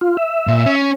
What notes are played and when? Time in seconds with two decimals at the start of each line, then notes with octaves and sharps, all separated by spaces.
0.01 F4
0.17 E5
0.47 A#2
0.66 C#4